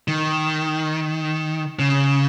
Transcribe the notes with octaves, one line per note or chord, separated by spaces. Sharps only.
D#3
C#3